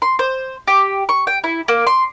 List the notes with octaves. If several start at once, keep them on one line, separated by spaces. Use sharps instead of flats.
C6
C5
G4
C#6
G5
E4
A#3
C6